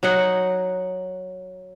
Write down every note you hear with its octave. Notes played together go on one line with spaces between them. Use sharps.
F#3 D#4 F#5